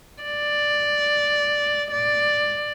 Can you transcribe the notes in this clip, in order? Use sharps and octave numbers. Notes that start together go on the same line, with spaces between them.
D5
D5